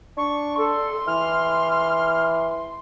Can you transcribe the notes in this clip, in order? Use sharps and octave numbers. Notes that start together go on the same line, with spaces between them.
D4 C#6
A4 C6
E3 F6